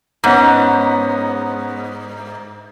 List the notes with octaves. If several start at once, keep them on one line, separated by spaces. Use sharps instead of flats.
G#2 B3 C#4 D#4